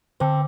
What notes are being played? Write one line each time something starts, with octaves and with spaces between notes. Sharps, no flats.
D3 C4